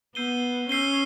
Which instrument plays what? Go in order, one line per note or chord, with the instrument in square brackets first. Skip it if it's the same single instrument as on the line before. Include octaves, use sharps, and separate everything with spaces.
[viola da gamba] B3 [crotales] E6 G6 C7 D#7 G7
[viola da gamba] C#4 [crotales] E6 G6 C7 D#7 G7